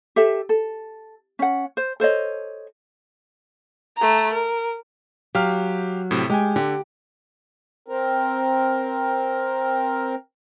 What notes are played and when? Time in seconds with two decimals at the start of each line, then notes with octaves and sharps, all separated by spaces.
0.16 G4 A4 E5
0.49 A4
1.39 C#4 F#5
1.77 C5
2.00 A4 C5 C#5 D#5
3.96 A3 A#5
4.33 A#4
5.35 F#3 G4 F5 F6
6.11 A2 C3
6.30 G#3 G4 G5 G#5
6.56 D3 G4
7.88 C4 A#4